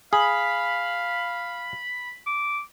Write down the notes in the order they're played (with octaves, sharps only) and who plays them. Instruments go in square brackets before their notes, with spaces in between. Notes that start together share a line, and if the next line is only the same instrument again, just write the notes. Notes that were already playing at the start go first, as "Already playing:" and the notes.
[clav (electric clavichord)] G#4 [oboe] F5 [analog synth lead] B5
[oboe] D6